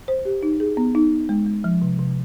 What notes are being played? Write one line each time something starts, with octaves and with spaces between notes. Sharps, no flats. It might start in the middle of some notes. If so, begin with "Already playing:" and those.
C5
G4
D#4
G#4
B3
D#4
B3
G#3
G#3
F3
C3
C3